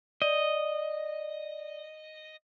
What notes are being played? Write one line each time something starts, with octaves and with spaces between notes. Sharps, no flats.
D5 D#5